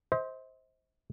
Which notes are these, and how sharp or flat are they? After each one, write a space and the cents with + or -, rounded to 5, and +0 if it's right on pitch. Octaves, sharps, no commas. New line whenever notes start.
C5 +0 D#5 +45